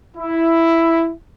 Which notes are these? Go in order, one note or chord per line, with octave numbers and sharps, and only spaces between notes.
E4